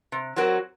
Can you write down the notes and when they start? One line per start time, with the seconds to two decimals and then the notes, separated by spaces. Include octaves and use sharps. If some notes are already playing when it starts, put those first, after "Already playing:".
0.12 C3
0.36 F#3 C4 F#4 A#4